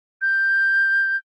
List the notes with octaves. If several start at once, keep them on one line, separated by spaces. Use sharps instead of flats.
G6